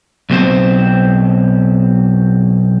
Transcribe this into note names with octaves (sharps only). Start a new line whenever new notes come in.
B1 B2 C4 C5